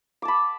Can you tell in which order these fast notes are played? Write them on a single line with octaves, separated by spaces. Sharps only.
D6 A5 B5